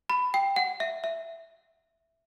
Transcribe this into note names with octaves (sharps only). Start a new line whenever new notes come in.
B5
G5
F#5
E5
E5